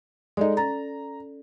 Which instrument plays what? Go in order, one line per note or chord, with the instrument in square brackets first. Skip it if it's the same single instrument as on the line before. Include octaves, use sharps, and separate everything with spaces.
[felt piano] G#3 D#4 [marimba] A4 D5
[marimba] C#4 A6 [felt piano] A#5